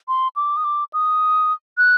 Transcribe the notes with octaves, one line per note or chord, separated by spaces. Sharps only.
C6
D6
D#6
D6
D#6
F#6